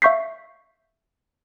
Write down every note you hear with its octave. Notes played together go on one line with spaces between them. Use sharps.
E5 F5 C#6 G6 B6 C7